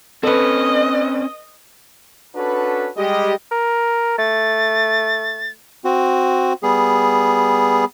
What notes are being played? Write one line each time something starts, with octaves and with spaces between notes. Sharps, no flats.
C4 C#4 A4 B4 D#5
C#4 D4 F#4 A4 B4
G3 G#3 G4 D#5
A#4
A3 A6
C4 F#4
G3 B3 G#4